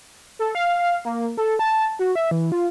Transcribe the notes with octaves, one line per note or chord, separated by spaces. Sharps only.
A4
F5
A#3
A4
A5
F#4
E5
E3
F4